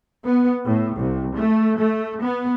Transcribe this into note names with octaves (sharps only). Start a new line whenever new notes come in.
B3
A2
C2
A3
A3
B3